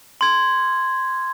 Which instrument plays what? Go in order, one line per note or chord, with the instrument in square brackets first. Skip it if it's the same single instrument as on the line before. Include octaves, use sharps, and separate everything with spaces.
[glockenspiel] C6 G#6